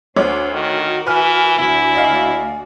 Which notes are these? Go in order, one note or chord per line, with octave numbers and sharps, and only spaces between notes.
D2 D4 C5 C#5 D6
D#3 F#4 A#4
E3 B4 G#5 F6
D2 E4 F#4 D5
D#5 F5